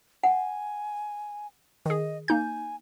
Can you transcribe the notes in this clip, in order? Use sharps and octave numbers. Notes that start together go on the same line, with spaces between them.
F#5 G#5
D#3 G#4 D#5
A#3 D#4 G#5 G6